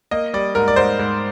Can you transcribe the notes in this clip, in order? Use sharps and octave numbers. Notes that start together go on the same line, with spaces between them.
A#3 D#5
G3 D5
G#2 A#4
D5
G#2 C5
G#2